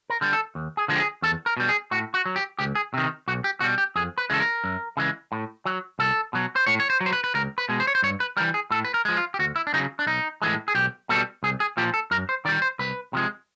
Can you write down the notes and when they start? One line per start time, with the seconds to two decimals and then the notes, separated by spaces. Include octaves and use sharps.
0.10 A#4
0.21 D3 G3
0.33 A4
0.55 D#2
0.77 G#4
0.88 D3 F3 G#3
0.96 G4
1.00 G#4
1.22 E2 A4
1.46 A#4
1.57 B2 G3
1.69 G#4
1.91 A2 F#4
2.14 F#4
2.26 F#3
2.36 G4
2.59 C#2 G4
2.75 G#4
2.94 C3 D#3
3.28 B1 F#4
3.44 G4
3.60 B2 G3 F#4
3.78 G4
3.95 F2 G#4
4.18 B4
4.30 C#3 E3 G#3 A4
4.40 A#4
4.64 F#2
4.97 C#3 E3 G#3
5.32 A2
5.65 F#3
5.99 C2 A4
6.33 B2 F#3
6.56 C5
6.67 A2 C#5
6.80 C#5
6.90 C5
7.01 F#3
7.06 C5
7.13 B4
7.24 B4
7.35 C#2 A#4
7.58 B4
7.69 B2 G#3
7.80 C5
7.87 C#5
7.95 C5
8.03 G2 C#5
8.20 B4
8.37 G3 A#4
8.40 E3
8.54 G#4
8.71 A2 A4
8.85 B4
8.94 A#4
9.05 F3 G#3
9.17 F4
9.34 G4
9.39 D2 F#4
9.56 E4
9.67 D4
9.74 C#3 F#3 D#4
9.99 D4
10.06 B1 D#4
10.42 A2 E3 G#3
10.68 G#4
10.75 B1 G4
11.09 B2 G3 A4
11.43 C2 G#4
11.60 G#4
11.77 A#2 F3 G4
11.94 A4
12.11 F#2 A#4
12.29 C5
12.45 D#3 D5
12.49 G3
12.62 C5
12.79 C2 B4
13.13 C3 F3 G#3